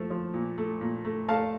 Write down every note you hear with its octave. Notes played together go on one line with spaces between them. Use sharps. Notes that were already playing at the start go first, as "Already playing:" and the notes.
Already playing: F3 A3
F3
A#2
A3
A#2
A3
A3 F5 A5